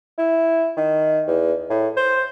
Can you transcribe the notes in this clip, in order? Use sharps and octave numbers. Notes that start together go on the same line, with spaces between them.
E4
D#3
E2
A2
C5